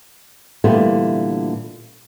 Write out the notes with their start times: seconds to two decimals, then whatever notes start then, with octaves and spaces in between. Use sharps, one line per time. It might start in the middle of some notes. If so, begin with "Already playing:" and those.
0.64 A#2 D3 E3 G3 A3 B3